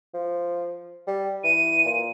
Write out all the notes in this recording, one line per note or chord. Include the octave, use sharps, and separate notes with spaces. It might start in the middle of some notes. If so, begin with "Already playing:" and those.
F3
G3
E3 D#7
A#2